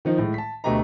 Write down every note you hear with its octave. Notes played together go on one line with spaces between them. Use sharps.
D#3 F3 D#4
A2 G#3
A5 B6
D2 B2 A3 G4 D#5 A#5